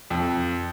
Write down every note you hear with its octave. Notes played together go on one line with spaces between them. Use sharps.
F2